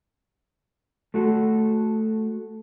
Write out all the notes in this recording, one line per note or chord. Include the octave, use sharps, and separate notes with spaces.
A3 F#4 A4